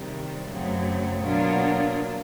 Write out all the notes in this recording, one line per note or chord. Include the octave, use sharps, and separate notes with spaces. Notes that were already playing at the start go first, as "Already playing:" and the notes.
Already playing: C3 D#3 G3
F#2 C#3 F#3 A3 C4
B2 F#3 A#3 D4 F4